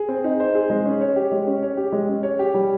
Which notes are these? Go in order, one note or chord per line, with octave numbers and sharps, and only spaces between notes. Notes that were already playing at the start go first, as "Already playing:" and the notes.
Already playing: G#4
C4
D#4
C5
G#4
G#3
C#4
C#5
G4
G#3
C#4
C#5
G4
G#3
C#4
C#5
G4
G3